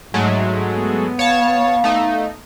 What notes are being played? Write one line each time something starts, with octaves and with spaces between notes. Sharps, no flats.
G#2 F#3 G#3 A3
B3
C#5 F5 A5
A3 D#4